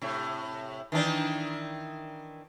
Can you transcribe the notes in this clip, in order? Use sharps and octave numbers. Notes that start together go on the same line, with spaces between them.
A2 C3
D#3 E3 D4